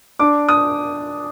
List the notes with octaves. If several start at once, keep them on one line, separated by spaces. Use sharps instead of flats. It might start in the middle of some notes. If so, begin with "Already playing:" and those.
D4 D6
D#6